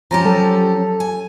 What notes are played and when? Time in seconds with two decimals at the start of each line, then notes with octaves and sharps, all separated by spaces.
0.11 F3 C#4 G4 A#5
0.25 F#3 A4
1.00 G#5